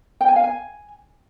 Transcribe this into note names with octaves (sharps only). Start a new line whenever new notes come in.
G5
G#5
F5
G#5